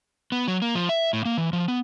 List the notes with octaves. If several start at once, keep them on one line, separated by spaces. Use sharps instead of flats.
B3
F#3
A#3
F3
E5
A2
A#3
E3
F3
B3